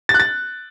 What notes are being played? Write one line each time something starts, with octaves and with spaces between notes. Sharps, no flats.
A6
F#6
A6